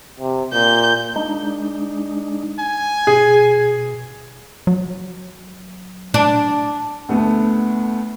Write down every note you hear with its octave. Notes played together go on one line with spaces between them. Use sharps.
C3
A#2 G6
G#3 D4 D#4
G#5
B2 G#4
F#3
D4
D2 A3 B3